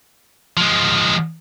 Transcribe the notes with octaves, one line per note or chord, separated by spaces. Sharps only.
F3 G#3